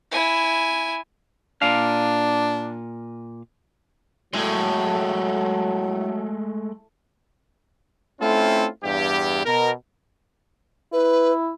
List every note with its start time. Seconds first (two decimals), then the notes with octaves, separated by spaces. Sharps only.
0.11 E4 G#5
1.62 A#2 D4 F5
4.33 A2 F#3 G#3 A3
8.21 A3 C4 C#4 E4 F4 A4
8.84 E2 G2 G4
9.45 B2 A#4
10.93 E4 B4